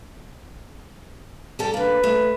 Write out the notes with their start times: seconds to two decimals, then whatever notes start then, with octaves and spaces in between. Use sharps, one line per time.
1.59 G3 A4 G5
1.74 D3 A#3 B4
2.03 A3